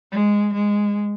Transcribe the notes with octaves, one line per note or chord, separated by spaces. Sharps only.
G#3
G#3